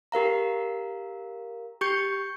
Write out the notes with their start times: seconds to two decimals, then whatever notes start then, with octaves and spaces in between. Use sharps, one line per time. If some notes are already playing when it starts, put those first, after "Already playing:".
0.12 G4 A#4 F5 A#5
1.81 G4 C#6 G6 C#7